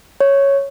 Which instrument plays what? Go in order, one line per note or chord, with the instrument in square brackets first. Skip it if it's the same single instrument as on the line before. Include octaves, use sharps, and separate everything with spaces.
[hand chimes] C#5